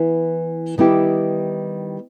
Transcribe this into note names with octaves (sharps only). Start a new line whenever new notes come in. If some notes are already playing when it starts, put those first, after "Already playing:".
Already playing: E3 B3 E4
D#3 G3 B3 E4 G4